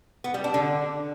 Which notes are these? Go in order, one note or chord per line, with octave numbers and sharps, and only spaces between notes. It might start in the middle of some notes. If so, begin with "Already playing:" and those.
B3
G3
D4
D3